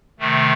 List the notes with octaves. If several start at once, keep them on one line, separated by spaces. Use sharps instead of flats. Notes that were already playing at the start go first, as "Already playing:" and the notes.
C3 D#3 A3